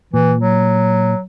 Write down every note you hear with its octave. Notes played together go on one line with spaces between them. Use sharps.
A#2 E3
F#3